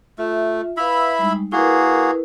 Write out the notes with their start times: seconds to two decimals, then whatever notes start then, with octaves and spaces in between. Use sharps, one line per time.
0.18 A3 F4 E5
0.77 E4 B4 E5 F5 B5 E6
1.19 G3 G#3 D#4
1.52 A#3 E4 F#4 G#4 A#4 B4